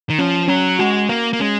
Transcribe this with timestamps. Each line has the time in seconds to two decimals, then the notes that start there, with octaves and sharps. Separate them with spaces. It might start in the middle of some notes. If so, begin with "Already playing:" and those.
0.10 D#3
0.19 F3 C#4
0.48 F#3 C#4
0.79 G#3 F#4
1.09 A#3 F5
1.33 A#3
1.40 G#3 C#4